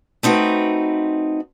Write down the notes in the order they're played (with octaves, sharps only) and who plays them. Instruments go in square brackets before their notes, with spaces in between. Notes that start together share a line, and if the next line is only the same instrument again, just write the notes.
[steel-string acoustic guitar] A3 C4 D#4 F#4 B4